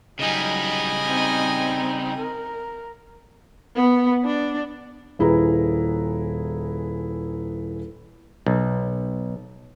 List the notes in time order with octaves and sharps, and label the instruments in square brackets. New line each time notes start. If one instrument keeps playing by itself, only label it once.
[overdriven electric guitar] C#3 G3 [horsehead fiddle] F#3 D#4 [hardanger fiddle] D#5 G#5
[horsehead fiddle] C4 D#4
A#4
[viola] B3
D4
[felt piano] D#1 E4 G#4 B4 A#5
[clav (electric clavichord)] B1